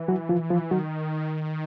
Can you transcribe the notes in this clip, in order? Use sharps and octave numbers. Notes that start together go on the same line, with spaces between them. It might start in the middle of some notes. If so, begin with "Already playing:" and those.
Already playing: E3
F#3 F#4
F3 F4
F3 F4
D#3 F#3 F#4